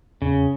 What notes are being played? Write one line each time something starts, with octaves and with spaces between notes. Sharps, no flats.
E2 C#3